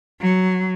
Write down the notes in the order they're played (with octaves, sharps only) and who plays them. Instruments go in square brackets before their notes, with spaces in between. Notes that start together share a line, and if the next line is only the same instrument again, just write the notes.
[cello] F#3